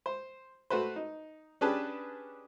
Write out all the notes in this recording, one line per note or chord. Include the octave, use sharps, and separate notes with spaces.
C5
A3 F#4 B4 C5
D#4
C#4 D4 G4 G#4 B4 A5